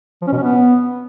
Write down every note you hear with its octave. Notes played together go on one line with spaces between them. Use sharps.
F3
C#4
B2
C#4
B3